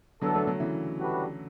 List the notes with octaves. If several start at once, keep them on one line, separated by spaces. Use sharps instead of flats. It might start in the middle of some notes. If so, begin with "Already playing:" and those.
D3 E3 F#3 B3 D4 A4
F#3 A3
D3 F#3
C#3 E3
A2 G3 D4 F#4 B4